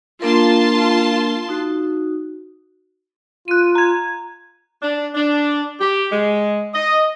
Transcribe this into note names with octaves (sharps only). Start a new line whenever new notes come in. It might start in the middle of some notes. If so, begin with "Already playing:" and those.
A#3 D4 F4 A#4 A5 C6
D#4 F#4
F4 F#6 D#7
A#5 G#6
D4
D4
G4
G#3
D#5